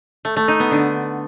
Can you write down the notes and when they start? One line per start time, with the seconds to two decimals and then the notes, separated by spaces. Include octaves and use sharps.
0.25 A3
0.36 A3
0.48 D#4
0.60 B3
0.71 D3